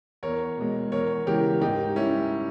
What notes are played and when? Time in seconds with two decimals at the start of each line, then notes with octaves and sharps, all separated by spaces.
0.23 E2 A#4 C#5
0.58 B2 G#3
0.92 E2 A#4 C#5
1.26 C#3 E3 G#3 G4 A#4
1.61 G#2 D#4 G4
1.96 G3 C#4 E4